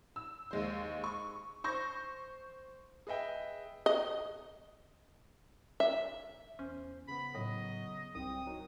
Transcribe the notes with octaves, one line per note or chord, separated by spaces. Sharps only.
E6
D#2 G#3 C5
C#6
C5 C#6 G6 A#6
G#4 B4 D#5 E5 G5
D#5
E5
E2 C#4 C5
C#3 B3 B5
A2 F#3 D#5
C2 G2 G3 C4 D#6
F#3 D#4 A#4